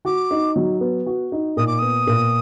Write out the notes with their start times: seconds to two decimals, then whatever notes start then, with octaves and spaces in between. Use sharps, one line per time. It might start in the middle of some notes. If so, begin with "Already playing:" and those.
0.05 F#4 D6
0.31 D#4
0.56 F#3
0.81 B3
1.06 F#4
1.32 D#4
1.57 A#2 D#6
1.67 D6
1.78 B3 D#6
2.07 A#2